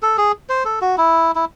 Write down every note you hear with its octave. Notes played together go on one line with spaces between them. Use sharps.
A4
G#4
C5
A4
F#4
E4
E4